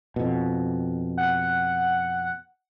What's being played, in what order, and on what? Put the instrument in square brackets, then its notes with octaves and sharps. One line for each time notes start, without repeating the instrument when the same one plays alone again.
[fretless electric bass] F2 B2
[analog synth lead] F#5